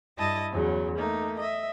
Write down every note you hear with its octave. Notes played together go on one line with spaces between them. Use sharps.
G2 E4 D#5 A5 D#6 A#6
E2 C#3 F#3
A3 A#3 D#4
D#5 E5